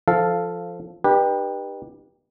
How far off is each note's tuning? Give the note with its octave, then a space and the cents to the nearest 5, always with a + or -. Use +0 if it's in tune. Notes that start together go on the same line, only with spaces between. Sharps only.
F3 -10 A4 +0 F5 +0
D#4 -40 G4 +15 B4 -20